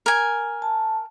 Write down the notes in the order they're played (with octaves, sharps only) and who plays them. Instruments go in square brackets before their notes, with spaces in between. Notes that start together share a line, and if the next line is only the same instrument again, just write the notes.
[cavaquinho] A#4 G#5
[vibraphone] A5